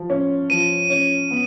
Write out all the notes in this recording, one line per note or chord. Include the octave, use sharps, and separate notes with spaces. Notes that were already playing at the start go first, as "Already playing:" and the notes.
Already playing: F3
C#4
F3 D#7
C#4
B3